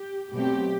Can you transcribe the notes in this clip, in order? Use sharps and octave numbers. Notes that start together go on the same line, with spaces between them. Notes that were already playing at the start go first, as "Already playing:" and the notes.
Already playing: G4
B2 F#3 A3 C4 G4